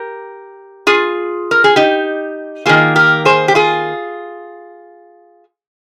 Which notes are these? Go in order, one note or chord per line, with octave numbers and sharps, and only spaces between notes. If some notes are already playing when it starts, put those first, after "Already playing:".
Already playing: G4 A#4
F4 G#4
A#4
G#4
D#4 G4
D#3 A#3 F4 G#4
G4 A#4
G#4 C5
G4
F4 G#4